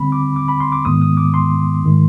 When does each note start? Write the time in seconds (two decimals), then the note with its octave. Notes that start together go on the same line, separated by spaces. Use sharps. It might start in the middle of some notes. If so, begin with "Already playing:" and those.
Already playing: D3 G3 C4 B5
0.12 D6
0.36 D6
0.48 B5
0.60 C6
0.72 D6
0.85 G#2 D#3 G#3 B3 D#6
1.01 D#6
1.17 D6
1.34 C6
1.83 G#2 D#3 G#3